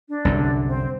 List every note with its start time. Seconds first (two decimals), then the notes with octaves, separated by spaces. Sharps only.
0.09 D4
0.25 C2 F#2 D3
0.68 C4